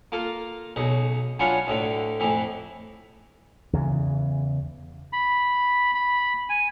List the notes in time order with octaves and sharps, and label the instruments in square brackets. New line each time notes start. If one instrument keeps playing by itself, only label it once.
[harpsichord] A#3 F4 A4
B1 C#3 D#5
F#3 C#4 D4 F4 B4 C#5
D2 A2 D3
F2 A2 E3
[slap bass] E2 C#3 E3
[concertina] B5
B5
G#5